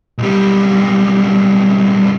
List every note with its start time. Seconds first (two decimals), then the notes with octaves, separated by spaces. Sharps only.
0.18 B1 G3